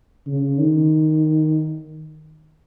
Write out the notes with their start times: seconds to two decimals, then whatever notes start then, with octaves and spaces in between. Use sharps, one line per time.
0.27 C#3
0.59 D#3